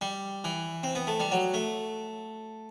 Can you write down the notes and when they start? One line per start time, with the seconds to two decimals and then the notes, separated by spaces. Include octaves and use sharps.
0.01 G3
0.44 E3
0.83 C4
0.95 B3
1.07 A3
1.20 G3
1.32 F#3
1.54 A3